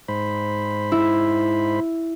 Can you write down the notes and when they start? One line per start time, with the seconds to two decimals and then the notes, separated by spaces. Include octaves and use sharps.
0.08 G#2 C5 B5
0.92 E4